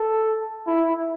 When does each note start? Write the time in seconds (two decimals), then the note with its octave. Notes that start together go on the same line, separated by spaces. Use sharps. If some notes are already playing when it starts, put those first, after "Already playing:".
Already playing: A4
0.67 E4